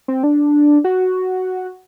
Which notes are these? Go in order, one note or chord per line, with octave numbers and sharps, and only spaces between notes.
C4
D4
F#4